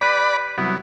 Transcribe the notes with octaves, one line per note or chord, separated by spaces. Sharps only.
G4 B4 D5 B5
C2 F#3 B3 E4